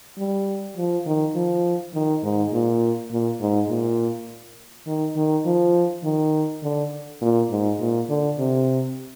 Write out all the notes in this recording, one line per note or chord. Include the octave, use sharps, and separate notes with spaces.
G3
F3
D#3
F3
D#3
G#2
A#2
A#2
G#2
A#2
D#3
D#3
F3
D#3
D3
A#2
G#2
A#2
D3
C3